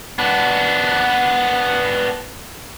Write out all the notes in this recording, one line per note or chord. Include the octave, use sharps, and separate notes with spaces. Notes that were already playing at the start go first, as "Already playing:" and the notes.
B3 D4